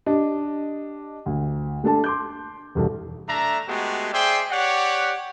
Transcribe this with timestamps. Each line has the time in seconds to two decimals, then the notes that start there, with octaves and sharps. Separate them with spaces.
0.06 D4 G4 D#5
1.26 D2
1.84 A3 D4 A4 A5
2.04 C6 D6 G6
2.75 E1 C2 A4
3.29 A3 D4 E5 A#5
3.68 G#3 A3 B3 F#4 G4
4.13 G#4 C5 D5 E5 G5 C6
4.51 G4 C#5 D5 F#5